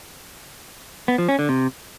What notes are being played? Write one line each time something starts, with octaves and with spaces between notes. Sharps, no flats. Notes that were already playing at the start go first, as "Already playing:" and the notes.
B3
F3
C#4
D3
C3